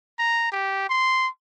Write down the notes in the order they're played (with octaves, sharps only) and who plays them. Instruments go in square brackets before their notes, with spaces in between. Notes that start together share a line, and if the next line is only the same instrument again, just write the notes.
[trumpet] A#5
G4
C6